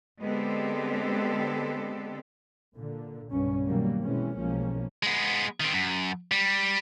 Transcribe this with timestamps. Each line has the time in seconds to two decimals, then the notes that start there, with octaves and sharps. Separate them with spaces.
0.20 D3 G#3 B3 C4 G4 A4
2.76 A#2 D3
3.31 B1 G2 C#3 C#4
3.67 B2 D#3 F#3 G3 A#3
4.02 B2 E3 G#3 C4 C#4
4.36 B1 F3 G#3 A#3 C#4
5.03 G#3 B3
5.60 D#3 C4
5.74 F#2
6.32 G3